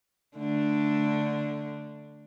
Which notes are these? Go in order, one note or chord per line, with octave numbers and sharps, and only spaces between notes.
D3 A3 D4